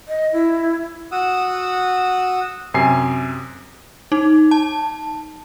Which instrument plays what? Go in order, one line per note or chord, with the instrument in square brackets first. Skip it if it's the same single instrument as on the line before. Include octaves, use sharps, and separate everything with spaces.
[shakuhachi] D#5
E4
[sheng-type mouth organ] F#4 F#5 D#6 E6
[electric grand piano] F#2 C3 G#5 C7
[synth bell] D#4
A5